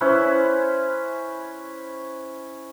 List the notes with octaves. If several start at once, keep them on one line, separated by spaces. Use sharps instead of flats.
C#4 E4 B4 C5